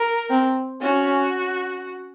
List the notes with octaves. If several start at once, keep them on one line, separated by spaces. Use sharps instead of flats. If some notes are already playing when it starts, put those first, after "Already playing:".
Already playing: A#4
C4
C#4 F#4